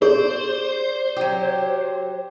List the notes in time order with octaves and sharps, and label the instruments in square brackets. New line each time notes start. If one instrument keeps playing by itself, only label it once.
[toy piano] G#4 [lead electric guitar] C5 [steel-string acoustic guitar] D5
[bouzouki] F#3 G4